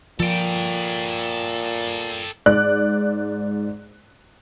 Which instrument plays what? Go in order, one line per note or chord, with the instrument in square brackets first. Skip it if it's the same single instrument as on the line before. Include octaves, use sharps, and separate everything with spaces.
[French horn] A#2 [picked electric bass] F3 [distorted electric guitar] A4 G5
[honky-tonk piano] G#2 D5 F#6